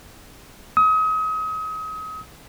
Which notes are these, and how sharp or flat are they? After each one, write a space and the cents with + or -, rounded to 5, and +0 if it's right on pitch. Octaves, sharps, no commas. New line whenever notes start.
D#6 +35